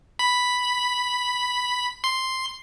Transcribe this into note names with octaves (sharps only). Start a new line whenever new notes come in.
B5
C6